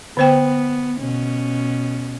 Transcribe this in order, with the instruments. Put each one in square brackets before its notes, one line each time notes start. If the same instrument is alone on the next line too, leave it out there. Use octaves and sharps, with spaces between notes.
[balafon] D3 C5 G5 [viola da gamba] B3
[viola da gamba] B2 C#4